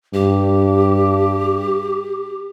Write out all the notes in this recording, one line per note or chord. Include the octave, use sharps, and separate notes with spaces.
G2 G4